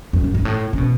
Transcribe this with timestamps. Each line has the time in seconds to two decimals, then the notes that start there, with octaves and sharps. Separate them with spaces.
0.13 F#2
0.24 F#2
0.34 G#2
0.45 A2
0.73 C#3
0.78 B2